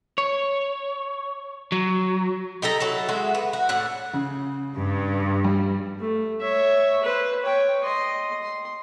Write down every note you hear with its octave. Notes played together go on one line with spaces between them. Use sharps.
C#5
F#3
D#4 G4 A4 A#5
F#3 E4 A4 A5
G#3 F#4 E5
B3
F#4
A2 D4 F#5
C#3
G2
G3
A3
C#5 E5
B4 C5
C#5 G5
D#5 C6
C6